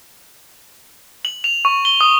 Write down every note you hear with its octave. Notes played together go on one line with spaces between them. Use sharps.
F#7
F7
C#6
G7
D#6